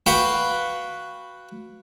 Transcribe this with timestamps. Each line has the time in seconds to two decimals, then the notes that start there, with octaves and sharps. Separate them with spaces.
0.06 F#4 B4 F5 G5